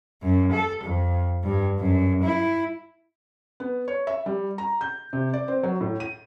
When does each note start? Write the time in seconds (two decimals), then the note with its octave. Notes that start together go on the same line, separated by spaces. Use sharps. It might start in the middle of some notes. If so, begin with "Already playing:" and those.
0.22 F#2
0.52 A4
0.84 F2
1.44 G2
1.79 F#2
2.23 E4
3.60 B3
3.88 C#5
4.07 E5
4.26 G3
4.58 A#5
4.81 G6
5.13 C3
5.33 D5
5.48 C4
5.63 F#3
5.81 A2
6.00 D#7